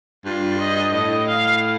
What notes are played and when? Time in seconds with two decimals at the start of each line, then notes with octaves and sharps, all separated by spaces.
0.25 G2 F4
0.58 D#5
0.93 A2 D#5
1.27 F5